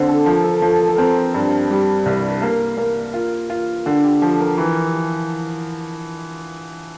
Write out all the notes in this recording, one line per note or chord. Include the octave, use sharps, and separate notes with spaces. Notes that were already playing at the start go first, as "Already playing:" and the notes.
Already playing: D3 C4 C5
A4
F3 A#4
A4
F3 A4
A#4
A4
C4 A#4
G2
G3
C2
A#3 A#4
A#3
F4
F4
D3 G4
G4
F3 A4
A#4
E3